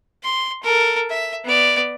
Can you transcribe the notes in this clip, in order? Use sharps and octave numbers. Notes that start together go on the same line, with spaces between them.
C6
A4 A#4
E5
B3 D5